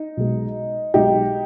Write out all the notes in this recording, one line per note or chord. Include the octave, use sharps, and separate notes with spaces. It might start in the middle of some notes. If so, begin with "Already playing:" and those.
Already playing: D#4
B1 B2 G#3
B1 B2 G#3 D#4 G4